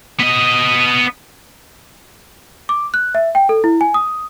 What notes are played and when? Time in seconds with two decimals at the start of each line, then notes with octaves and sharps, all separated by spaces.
0.19 B3 D#5
2.69 D6
2.94 F#6
3.15 E5
3.35 G5
3.49 A4
3.64 E4
3.81 G#5
3.94 D#6